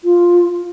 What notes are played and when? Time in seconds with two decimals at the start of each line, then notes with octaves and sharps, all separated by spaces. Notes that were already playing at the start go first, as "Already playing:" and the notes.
0.04 F4